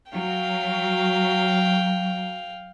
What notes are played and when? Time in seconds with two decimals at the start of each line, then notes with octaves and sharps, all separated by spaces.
0.12 F#3 F5 G5